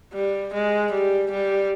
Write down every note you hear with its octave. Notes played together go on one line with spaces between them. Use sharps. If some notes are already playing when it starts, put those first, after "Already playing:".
G3
G#3
G3
G3